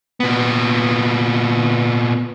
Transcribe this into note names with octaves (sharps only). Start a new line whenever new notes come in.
A#2 B3